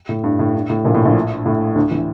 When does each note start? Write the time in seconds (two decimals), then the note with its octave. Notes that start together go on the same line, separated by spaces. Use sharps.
0.09 A2
0.24 G2
0.39 A2
0.55 G2
0.70 A2
0.85 A#1 A#2
0.94 A2
1.05 A#1 A#2
1.46 A2
1.75 D2 D3
1.91 E3